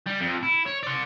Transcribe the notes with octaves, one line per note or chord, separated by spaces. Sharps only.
G3
F2
E4
C#5
D5 C6